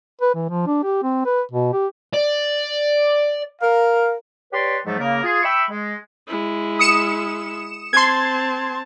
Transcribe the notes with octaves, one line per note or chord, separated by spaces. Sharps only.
B4
E3
F3
D4
G4
C4
B4
B2
G4
D5
A#4 F5
G4 B4 C#5 D5 A5 C6
G#2 F3 F#3 G#3 A3
C#3 A#3 A#4
F4 G#4
E5 G5 B5 C#6 E6
G#3
G#3 E4
D#6 C#7 E7
C4 A5 C6 G#6